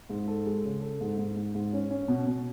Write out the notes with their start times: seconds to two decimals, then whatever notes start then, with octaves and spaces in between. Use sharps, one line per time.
0.09 G#2
0.27 A4
0.46 G#3
0.64 C#3
0.81 A4
1.01 G#2
1.18 G#2
1.36 G#2
1.55 G#2
1.73 C#4
1.90 C#4
2.08 B2
2.26 B2